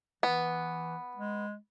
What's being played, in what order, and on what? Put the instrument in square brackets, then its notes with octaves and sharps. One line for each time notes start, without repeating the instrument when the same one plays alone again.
[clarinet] E3 [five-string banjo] B3
[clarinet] G#3